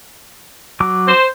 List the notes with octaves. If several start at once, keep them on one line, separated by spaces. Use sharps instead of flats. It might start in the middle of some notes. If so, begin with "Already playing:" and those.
F#3 D6
C5